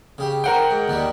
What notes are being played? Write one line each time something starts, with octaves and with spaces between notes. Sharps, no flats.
C#3 G4
A#4 C5 F#5 G5
G#2
D#2 D#3 G3